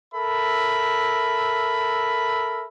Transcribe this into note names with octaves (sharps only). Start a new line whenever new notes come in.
A4 A#4 E5 B5